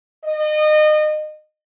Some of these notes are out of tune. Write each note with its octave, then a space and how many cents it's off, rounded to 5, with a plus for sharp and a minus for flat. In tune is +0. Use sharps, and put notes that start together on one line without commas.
D#5 -30